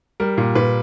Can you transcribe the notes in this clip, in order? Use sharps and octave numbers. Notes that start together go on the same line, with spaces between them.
G3 A#4
A#2
A#2 B4